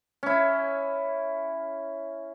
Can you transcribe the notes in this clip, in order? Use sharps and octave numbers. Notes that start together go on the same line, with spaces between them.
C#4 E4